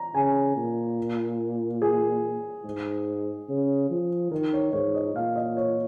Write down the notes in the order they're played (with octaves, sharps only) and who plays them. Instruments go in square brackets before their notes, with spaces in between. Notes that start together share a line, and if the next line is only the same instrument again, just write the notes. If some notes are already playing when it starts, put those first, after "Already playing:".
Already playing: [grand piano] A#5
[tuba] C#3 [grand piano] G#5
[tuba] A#2
[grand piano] G#4
[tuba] G#2
C#3
F3
[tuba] D#3 [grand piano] A#4
[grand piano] C#5
[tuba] G#2 [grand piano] C#5
[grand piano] D#5
[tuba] A#2 [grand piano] F5
[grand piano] D#5
C#5